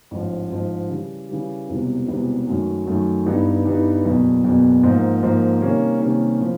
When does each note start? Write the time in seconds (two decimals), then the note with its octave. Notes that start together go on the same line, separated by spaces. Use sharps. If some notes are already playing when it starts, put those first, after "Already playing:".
0.11 A1 G#2 F3
0.51 A1 G#2 F3
0.90 C#3 E3 G3
1.29 C#3 E3 G3
1.69 E1 E2 C3 E3 G3
2.08 E1 E2 C3 E3 G3
2.47 F#2 D#3 F#3 A3
2.87 F#2 D#3 F#3 A3
3.26 G2 E3 G3 B3 D#4
3.65 G2 E3 G3 B3 D#4
4.04 F#1 E2 B2
4.44 F#1 E2 B2
4.83 G#2 F3 A#3
5.23 G#2 F3 A#3
5.62 C3 D#3 G3 A#3 C#4
6.01 C3 D#3 G3 A#3 C#4
6.40 A2 F3